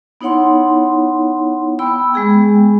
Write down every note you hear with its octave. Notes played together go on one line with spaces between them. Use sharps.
B3 D#4 E4 C#5 F#5 C6
B3 G5 B5 E6
G#3 B3 G#4 G5